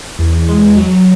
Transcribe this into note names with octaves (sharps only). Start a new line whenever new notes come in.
E2
G#3
F#3